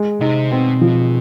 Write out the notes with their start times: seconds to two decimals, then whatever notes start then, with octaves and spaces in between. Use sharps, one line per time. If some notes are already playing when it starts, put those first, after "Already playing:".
Already playing: G#3
0.21 C3 D#4
0.51 B2 C4
0.81 F3